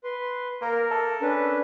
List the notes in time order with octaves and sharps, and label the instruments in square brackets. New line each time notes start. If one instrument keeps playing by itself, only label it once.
[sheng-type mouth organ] B4 C6
[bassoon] A#3 [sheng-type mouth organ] A#4
[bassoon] A4
[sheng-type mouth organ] C#4 D4 B4